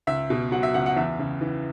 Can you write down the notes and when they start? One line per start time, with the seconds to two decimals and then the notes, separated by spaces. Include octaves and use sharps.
0.07 C#2 E5
0.30 B2
0.52 F#3 F#5
0.63 E5
0.74 C#2 F#5
0.86 F#5
0.96 E2 E5
1.19 C#3
1.41 E3